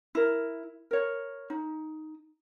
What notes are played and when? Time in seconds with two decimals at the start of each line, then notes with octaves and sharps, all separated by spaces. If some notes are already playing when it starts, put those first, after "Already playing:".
0.15 E4 A#4
0.91 A#4 C#5
1.50 D#4